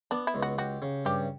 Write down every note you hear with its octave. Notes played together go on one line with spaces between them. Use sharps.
B3 D4
E4
C#2
F#4
F#4 G4
C#3
G2 G4